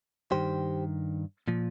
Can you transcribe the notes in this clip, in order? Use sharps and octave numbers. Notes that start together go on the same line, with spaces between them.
G2 D#3 G4 C5
A#2 F3